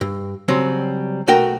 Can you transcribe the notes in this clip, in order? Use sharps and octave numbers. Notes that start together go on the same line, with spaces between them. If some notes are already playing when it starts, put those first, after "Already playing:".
G2
C#3 F#3 G3 C4
B1 A3 F#4 A#4 G5